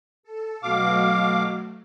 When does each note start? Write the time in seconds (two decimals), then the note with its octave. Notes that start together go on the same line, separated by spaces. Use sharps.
0.23 A4
0.63 B2 F#3 A3 F5 D6